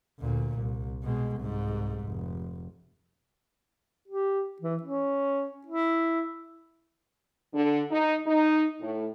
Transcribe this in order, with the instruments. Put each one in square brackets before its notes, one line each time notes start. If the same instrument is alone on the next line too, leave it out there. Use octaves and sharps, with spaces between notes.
[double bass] D2 A#2
C2
B2 G#3
C2 G#2
F1
[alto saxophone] G4
E3
C#4
E4
[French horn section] D3
D#4
D#4
A2